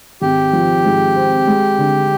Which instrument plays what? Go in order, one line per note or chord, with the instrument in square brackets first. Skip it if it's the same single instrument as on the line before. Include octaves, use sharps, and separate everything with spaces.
[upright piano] G#1 [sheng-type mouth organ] G4
[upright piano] F3
G#2
C4
G#3
D3